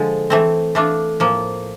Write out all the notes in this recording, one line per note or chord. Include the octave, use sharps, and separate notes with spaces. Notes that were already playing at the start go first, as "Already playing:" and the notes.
Already playing: D3 F3 G#3
E3 A3 C4
E3 A3 D4 F4
A2 F3 A#3